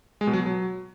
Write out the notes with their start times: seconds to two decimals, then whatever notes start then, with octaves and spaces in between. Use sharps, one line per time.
0.21 G#3
0.27 B2
0.33 F#3
0.40 B2
0.46 F#3